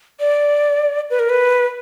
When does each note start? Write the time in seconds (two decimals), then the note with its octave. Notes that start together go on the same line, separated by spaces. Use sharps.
0.20 D5
1.10 B4
1.19 A#4
1.29 B4